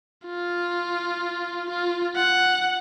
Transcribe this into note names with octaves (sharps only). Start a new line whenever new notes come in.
F4
F4
F#5